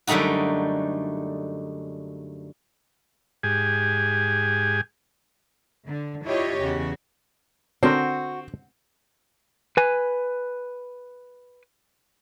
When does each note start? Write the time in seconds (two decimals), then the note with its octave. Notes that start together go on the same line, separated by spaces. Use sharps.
0.07 F#2 D3 G3 A3 D#4 F#4
3.43 G#2 G4 G#4 G#5
5.86 D3
6.24 D4 E4 F4 G4 C#5 D#5
6.59 E2 C#3 F#4
7.83 D3 C4 F#4 A#4
9.77 B4 G#5